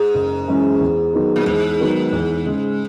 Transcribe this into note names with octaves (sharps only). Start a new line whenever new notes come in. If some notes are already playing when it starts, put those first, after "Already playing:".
Already playing: G#2
F#1
F#2 E3 G#3 C#4
E2
D#3 F#3 B3 D#4
A#2
E2 G#2
D#3 F#3 B3 D#4
E2
C#3 G#3